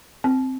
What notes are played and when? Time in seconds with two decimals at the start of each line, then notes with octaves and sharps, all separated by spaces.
0.24 C4